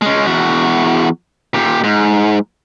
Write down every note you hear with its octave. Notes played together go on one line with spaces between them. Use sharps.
G#3 C#4
E2 F#4
A#2 G4
G#2